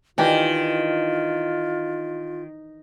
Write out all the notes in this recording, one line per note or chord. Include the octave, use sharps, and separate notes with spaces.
D#3 E3 D4 F4 G4